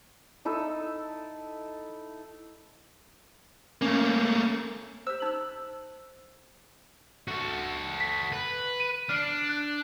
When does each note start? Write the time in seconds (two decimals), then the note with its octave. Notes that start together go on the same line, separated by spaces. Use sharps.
0.45 D#4 E4 A4 E6
3.82 A3 A#3 C#4
5.07 G4 C5 E6
5.22 D#4 E6 F#6
7.28 F#4 A4
8.00 B6
8.32 B4
8.80 D#7
9.09 D4 F6 C7 D7
9.49 F#6